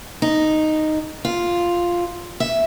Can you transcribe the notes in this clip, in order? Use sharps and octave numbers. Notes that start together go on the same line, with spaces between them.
D#4
F4
E5